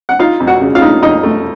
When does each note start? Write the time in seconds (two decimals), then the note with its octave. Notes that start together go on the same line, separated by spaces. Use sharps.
0.09 F#5
0.19 D#4 F4 F5
0.40 F2
0.47 F#4 F#5
0.61 C#3
0.75 F4 F5
0.82 D#4
1.02 F2 D#4 D#5
1.23 A3